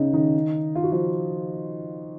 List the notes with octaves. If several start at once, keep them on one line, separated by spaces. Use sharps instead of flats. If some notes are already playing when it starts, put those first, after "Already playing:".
Already playing: C#3 C#4 D#4
D#3 D#4
F4
F#4
F3 F4